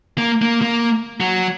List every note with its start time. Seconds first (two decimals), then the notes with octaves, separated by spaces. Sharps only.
0.18 A#3
0.42 A#3
0.62 A#3
1.20 F#3